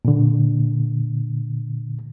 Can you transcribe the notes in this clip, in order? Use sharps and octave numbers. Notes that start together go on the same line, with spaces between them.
A#2 D3